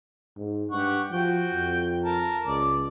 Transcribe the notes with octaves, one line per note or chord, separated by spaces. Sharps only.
G#2
G2 G4 F#5 C#6
F3 F#4 G5
F2
A#4 A5
C#2 D5